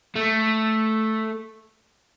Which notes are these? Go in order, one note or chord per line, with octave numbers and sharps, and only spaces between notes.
A3